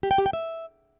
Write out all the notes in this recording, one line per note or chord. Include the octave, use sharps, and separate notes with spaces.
G4
G5
G4
G5
E5